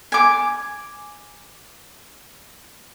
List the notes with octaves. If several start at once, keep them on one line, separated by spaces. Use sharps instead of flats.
G#5 D6